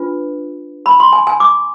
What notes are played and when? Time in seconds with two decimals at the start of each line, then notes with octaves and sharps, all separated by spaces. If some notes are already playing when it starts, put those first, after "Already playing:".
Already playing: D4 F4 B4
0.86 B5
1.00 C6
1.13 G#5
1.27 G#5
1.40 D6